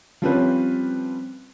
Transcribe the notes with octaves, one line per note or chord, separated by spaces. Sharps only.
F3 G3 C4 C#4 F4 B4